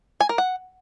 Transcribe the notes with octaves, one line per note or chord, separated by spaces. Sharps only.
G#5
A#4
F#5